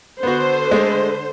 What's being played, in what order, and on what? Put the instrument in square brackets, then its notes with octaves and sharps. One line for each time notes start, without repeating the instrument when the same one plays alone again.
[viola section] D3 C5 [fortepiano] B3 F#4
[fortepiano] G#3 A3